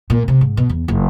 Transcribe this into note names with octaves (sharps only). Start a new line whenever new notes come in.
A#2
C3
G#2
B2
E2
F#1